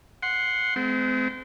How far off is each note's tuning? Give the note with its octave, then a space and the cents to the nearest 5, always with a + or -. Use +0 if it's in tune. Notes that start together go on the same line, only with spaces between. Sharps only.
F#5 -10 C6 +0
G#3 +35 C4 -35